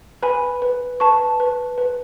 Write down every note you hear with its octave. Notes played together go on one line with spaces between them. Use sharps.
B4 G#5 B5
B4
B4 A5 C#6
B4
B4